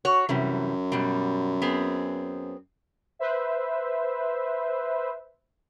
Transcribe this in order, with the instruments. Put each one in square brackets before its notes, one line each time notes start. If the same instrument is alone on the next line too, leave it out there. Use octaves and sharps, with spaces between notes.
[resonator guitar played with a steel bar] F#4 C#5
[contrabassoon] F#2 [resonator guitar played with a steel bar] C3 E3 G3
[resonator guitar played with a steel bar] B2 G3
B3 C4 G#4
[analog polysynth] B4 C5 E5